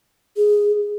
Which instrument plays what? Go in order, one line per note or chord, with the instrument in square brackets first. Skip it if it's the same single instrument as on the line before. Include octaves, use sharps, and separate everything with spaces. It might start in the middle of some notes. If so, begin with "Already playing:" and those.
[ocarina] G#4